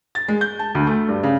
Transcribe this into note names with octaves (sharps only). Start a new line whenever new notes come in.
A6
G#3
G6
A5
D2
A3
G2
C#3